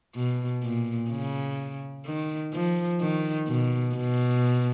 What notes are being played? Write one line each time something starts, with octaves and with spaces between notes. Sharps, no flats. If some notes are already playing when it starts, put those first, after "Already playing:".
B2
A#2
C#3
D#3
F3
D#3
B2
B2